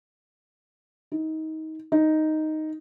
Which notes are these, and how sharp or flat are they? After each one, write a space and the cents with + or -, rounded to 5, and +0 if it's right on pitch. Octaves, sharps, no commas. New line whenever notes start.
D#4 +25
D#4 +0